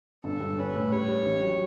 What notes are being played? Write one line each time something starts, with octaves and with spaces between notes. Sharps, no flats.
G1 A4
G2
C#4 B4
A2
G3 C#5
G3
A1
F#3